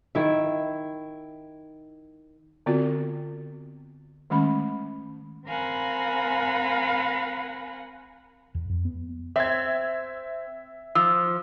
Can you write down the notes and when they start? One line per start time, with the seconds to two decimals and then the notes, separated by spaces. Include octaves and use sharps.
0.15 D#3 E4 E5
2.66 D3 B3 C4 F4 F#4 D5
4.30 D#3 G#3 A3 C#4 B5
5.48 C4 A#4 F5 F#5 G#5 B5
8.55 E2
8.69 F2
8.85 B3
9.36 C4 E5 G#6
10.95 F3 E6